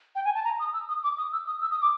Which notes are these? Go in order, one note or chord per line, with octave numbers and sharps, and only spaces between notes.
G5
G#5
A5
A#5
D#6
E6
D#6
D6
D#6
E6
D#6
E6
D#6
D6